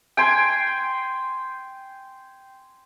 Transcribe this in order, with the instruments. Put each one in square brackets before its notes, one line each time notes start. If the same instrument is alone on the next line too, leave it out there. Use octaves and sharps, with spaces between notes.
[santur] G5 G#5 C6